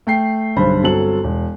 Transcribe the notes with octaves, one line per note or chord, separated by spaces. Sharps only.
A3 G5 C7
B1 G2 D3 C5 B5
G1 F#3 C4 A4 F#7
E1